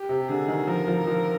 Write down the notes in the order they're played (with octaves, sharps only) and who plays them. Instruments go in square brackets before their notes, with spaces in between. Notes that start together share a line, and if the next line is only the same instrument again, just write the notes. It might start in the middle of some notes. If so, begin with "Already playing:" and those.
Already playing: [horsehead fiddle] G4
[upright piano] C3
[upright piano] D3 [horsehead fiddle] G#4
[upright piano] D#3
[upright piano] F3 [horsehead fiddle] A#4
[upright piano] F3
F3